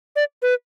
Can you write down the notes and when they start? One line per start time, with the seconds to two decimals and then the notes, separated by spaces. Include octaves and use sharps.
0.16 D5
0.42 B4